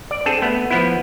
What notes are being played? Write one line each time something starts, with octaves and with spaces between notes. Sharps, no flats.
D5
C4 D4 G#4 A4
A3 B3
F3 B3 E4